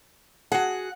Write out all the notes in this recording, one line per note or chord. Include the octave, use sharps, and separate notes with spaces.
F#4 G#4 F#5